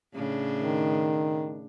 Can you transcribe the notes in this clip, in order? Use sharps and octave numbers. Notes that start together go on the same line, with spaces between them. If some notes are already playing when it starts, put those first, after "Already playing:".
A2 C#3 D4
D#3